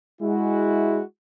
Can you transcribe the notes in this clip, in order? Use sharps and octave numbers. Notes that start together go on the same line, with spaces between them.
G#3 E4 F#4